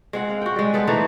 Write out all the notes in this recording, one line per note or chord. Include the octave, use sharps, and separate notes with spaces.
G#3 C4 F#5
F5
F#4 G5
G3 G#3
B3 A4 B4 C5
E3 A3 D#4